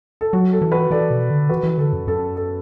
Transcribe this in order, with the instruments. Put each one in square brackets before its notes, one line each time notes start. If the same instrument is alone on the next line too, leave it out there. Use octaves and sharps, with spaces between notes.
[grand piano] A4
[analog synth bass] F#3 [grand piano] F#4
[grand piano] A4
[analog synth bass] E3
[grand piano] F#4 B4
[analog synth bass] E3 [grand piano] A4 D5
[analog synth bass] B2
D3
[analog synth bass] E3 [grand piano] F#4 B4
[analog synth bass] E3
[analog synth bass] D3 [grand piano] A4
[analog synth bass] F#2
[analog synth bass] F#2 [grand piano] A4
[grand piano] A4